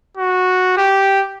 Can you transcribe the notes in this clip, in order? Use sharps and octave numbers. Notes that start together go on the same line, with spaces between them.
F#4
G4